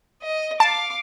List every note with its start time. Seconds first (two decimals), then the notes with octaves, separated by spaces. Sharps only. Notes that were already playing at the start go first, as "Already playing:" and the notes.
0.23 D#5
0.60 F5 A5 D6